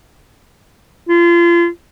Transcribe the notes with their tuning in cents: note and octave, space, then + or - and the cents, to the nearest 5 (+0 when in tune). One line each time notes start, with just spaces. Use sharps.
F4 -30